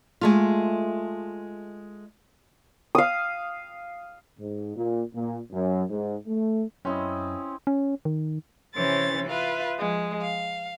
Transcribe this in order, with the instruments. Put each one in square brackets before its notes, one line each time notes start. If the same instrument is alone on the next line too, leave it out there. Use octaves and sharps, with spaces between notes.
[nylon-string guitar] G#3 A3 F4
[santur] F5 D#6
[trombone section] G#2
A#2
A#2
F#2
G#2
A3
[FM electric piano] F#2 [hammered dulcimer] C4 E4 D#5 [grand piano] C#4
[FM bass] C#4
D#3
[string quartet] C3 E3 C#4 C5 C#5 A6
F4 B4 E5 F5
F3 G#3
F5